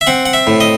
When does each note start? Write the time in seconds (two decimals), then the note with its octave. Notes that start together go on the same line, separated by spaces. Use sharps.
0.01 E5
0.07 C4 F#5
0.26 F#5
0.33 E5
0.47 A2
0.61 D#5